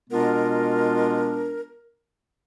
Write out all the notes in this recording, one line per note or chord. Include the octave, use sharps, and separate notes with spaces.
B2 G#3 B3 D4 F4 A#4